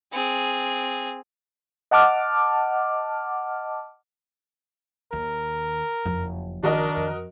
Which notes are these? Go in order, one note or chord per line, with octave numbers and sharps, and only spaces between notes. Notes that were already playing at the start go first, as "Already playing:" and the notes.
C4 G#4
D#5 F#5 A5 D6 F6
D#2 A#4
F#1 F2 F3
D#3 D4 F#4 A#4 D#5
F2